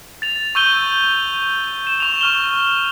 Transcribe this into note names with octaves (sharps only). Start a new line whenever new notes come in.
A6 F7
C#6 E6 G6 D#7 G7
E7
C#6 F7
C#6 F6 G7